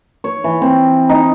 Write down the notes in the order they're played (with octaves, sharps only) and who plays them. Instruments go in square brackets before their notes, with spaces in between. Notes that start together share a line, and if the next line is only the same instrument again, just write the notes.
[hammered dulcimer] C#5
E3
C4
D#4